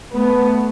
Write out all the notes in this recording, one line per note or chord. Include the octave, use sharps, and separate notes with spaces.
A3 B3